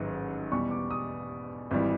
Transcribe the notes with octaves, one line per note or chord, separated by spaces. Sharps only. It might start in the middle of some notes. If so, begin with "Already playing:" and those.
Already playing: A1 G#2 D#3 F#3
E2 B2 G3 C#6
D6
D#6
G#1 E3 G3